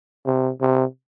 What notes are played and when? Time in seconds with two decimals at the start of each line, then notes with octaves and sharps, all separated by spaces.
0.26 C3
0.61 C3